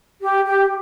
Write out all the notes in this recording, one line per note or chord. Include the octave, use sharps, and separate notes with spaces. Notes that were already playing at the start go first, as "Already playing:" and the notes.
G4
G4